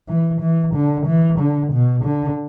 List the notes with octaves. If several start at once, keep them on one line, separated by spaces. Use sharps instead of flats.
E3
E3
D3
E3
D3
B2
D3